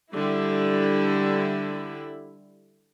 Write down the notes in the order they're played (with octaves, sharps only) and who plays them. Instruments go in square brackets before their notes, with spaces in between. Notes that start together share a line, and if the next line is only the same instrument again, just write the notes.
[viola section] D3 G3 E4